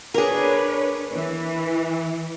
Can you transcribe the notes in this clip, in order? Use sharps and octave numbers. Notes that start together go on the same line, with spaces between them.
D4 G#4 A#4 B4 C#5
E3